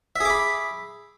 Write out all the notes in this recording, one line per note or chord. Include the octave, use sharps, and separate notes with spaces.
G#4 E5 B5 D6